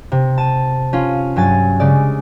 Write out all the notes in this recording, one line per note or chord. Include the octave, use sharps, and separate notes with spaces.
C3
A5 D#7
C#4 F4
G2 F#3 G#5 A6
C#3 G#3 D5